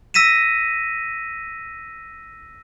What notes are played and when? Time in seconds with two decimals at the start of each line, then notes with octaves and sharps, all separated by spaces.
0.14 E6 A#6 B6 D#7 E7